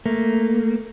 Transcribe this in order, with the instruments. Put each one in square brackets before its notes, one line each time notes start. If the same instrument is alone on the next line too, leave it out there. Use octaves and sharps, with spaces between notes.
[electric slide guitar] A3 A#3